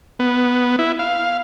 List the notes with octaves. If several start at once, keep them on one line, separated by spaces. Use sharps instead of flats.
B3
E4
F5